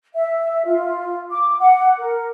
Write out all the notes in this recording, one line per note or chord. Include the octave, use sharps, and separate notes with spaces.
E5
F4
D6
F#5
A#4